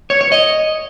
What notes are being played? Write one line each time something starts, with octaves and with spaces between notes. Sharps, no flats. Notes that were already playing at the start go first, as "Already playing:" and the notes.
C#5
C#5
D#5